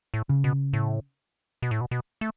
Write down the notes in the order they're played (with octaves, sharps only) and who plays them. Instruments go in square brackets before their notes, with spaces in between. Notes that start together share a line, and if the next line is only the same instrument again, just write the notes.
[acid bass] A2
[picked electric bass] C#3
[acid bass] B2
A2
B2
A2
B2
B2
A3